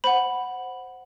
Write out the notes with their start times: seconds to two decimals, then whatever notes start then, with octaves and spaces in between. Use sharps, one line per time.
0.04 C5 F#5 B5